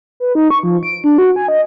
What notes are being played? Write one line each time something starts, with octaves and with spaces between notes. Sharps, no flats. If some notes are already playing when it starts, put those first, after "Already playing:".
B4
D#4
C#6
F3
D7
D4
F#4
G#5
D#5